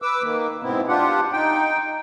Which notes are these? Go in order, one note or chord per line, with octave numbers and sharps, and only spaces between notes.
B4 D6 E6
D#3 A#3
G#2 B2 B3 C4 E4
D4 F4 G4 F#5
D#4 G5